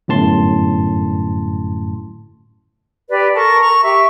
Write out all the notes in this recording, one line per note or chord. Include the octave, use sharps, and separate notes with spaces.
G1 F#2 A2 A5 C6
G4 B4 D5
A4 A#4 A5 C#6
A#5 C#6
G4 E5 C#6